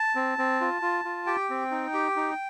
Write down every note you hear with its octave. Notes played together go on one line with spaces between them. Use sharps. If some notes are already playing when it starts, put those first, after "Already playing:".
Already playing: A5
C4
C4
F4
F4
F4
G4 G5
C4
D#4
G4
D#4